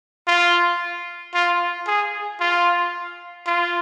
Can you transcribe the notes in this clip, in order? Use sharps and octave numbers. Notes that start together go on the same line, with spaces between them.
F4
F4
G#4
F4
F4